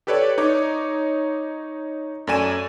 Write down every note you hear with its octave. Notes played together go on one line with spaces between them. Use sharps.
G4 A4 B4 C#5 D5
D#4 C#5 D6
F#2 A3 D5 G#5 D#7 E7